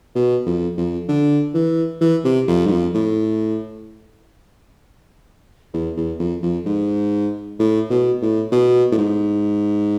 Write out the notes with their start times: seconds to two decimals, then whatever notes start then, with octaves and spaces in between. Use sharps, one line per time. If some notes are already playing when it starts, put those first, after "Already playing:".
0.15 B2
0.46 F2
0.77 F2
1.08 D3
1.54 E3
2.01 E3
2.24 C3
2.47 F2
2.66 G#2
2.71 F2
2.94 A2
5.73 E2
5.97 E2
6.19 F2
6.42 F2
6.66 G#2
7.59 A2
7.90 B2
8.21 A2
8.52 B2
8.92 A2
8.98 G#2